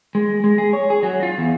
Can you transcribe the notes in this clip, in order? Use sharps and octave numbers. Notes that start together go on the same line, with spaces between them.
G#3
G#3
G#4
C#5
G#4
F#3
F4
E2